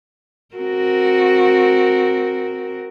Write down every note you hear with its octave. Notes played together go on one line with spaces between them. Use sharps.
C4 F#4 A#4